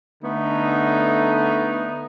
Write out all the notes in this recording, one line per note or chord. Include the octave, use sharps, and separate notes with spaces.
D3 A3 B3 D#4